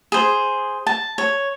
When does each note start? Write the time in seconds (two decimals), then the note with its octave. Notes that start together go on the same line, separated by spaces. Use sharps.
0.12 G#4 C5
0.87 A5
1.18 C#5